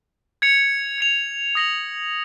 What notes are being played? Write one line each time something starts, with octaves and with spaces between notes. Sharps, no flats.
G#6 C#7 F7
G#6 C#7 F7
D#6 A#6 C#7 F#7